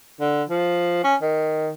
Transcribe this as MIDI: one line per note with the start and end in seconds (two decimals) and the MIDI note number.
0.20 0.43 50
0.49 1.02 53
1.04 1.15 61
1.21 1.70 51